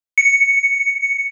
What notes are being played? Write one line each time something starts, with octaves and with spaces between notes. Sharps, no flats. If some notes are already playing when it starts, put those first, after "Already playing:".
C#7